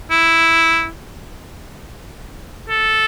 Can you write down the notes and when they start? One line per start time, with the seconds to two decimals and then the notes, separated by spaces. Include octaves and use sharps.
0.11 E4
2.69 A4